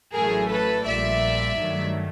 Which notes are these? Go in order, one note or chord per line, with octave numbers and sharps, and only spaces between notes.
A1 A2 F#3 A3 G#4 A#4
A4 B4
A#1 A#2 G3 D5 E5
G2 D#3 F#3 A3